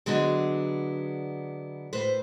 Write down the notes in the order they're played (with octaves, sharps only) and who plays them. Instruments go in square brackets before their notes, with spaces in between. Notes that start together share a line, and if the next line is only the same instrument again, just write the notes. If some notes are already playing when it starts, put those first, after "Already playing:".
[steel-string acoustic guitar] D3 F#3 G#3 B3 D4 E4
A2 B4 C5